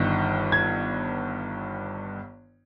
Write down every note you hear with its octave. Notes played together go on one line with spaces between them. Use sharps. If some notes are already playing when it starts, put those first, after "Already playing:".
Already playing: G1 G2 D#3
G#6